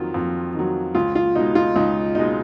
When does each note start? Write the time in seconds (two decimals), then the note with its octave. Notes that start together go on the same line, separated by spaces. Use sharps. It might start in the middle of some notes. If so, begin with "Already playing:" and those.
Already playing: F2 D#3 F#3 F4
0.14 F2
0.54 D#3 F#3
0.95 C#2 F4
1.15 F4
1.35 B2 G#3 D#4
1.55 F4
1.76 C#2 D#4
2.15 B2 G#3 D#4